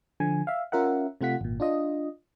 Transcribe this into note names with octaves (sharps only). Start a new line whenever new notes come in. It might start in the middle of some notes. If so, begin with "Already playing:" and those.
D3 F3 G#5
E5 F5
C#4 F4 A#4 E5 F#5
C3 A3 F4 F#5 B6
G#1 A#2
D4 F4 D#5